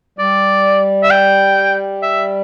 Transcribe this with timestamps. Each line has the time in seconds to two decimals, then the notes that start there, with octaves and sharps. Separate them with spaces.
0.19 G3 D5
1.03 E5
1.11 G5
2.03 E5